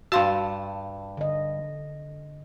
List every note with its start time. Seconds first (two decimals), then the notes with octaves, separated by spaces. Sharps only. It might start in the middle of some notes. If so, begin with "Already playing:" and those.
0.12 G2 F#4 F5 A5 C6
1.17 D3 D#5